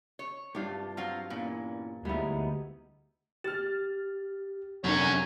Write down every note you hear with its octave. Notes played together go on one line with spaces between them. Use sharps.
C#5
C2 G2 D4 F4 G4
F#3 C4 F4 F5
E2 A#2 E3 C#4
D2 G3 G#3 B3 D#4 E4
G4 F6 A6
F1 F#2 F#3 C#4 D4 C#5